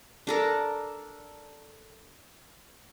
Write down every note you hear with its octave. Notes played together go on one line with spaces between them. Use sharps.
D4 A4 A#4